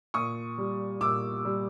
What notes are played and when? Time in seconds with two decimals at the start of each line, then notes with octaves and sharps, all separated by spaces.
0.14 A#2 C#6 D#6
0.58 G3
1.01 A#2 D6 E6
1.45 G3